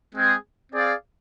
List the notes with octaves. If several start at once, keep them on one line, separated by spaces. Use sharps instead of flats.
G#3 C4 G#4
C4 G#4 D5 F5